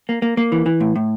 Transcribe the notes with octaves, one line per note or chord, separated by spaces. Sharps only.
A#3
A#3
A#3
E3
E3
A2
A2